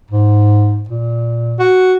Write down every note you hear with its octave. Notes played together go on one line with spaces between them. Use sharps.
G#2
A#2
F#4